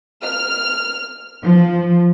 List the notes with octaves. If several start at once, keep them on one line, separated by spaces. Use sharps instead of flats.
F6
F3